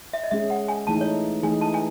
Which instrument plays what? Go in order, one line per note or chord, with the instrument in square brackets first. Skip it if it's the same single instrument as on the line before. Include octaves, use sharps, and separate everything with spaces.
[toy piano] E5
D#5
[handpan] G#3 C#4 G#4 [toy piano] E5
[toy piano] F#5
G#5
[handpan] E3 A3 D#4 G#4 [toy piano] A5
[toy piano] C#5
[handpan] E3 A3 D#4 G#4 [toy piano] G#5
[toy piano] A5
G#5